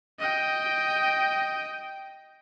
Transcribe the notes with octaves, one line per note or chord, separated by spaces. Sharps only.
D#5 G5